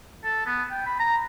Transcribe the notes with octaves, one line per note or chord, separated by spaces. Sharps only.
A4
B3
G5
B5
A#5